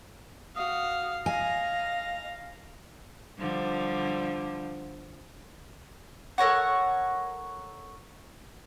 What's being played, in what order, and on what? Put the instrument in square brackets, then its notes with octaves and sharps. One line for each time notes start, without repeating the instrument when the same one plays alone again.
[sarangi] F#4 [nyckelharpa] F5 [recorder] D#6
[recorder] D#5 [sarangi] F5 [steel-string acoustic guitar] G#5 [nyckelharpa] A#5
[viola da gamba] D3 F3 G3
[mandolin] A4 A#4 C#5 F#5